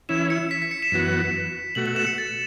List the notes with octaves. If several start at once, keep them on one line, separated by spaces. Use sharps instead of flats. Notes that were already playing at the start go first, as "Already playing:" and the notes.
E3 C#4 E4 E7
C#7
B6
B6
C#7
E7
F#2 E3 B3 F#4
B2 A3 F#4 F#7
F#7
E7
C#7
A6